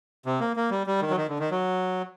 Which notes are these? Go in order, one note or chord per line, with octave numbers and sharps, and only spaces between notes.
C3
A#3
A#3
G3
G3
D#3
F#3
D#3
D3
D#3
F#3